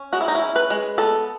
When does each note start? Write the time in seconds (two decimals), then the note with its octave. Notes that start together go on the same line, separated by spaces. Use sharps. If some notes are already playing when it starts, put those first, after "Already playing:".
Already playing: C#4
0.13 G#3 F#4
0.21 E4
0.28 D#4
0.35 E4
0.42 C#4
0.56 B4
0.70 G#3
0.98 B3 A4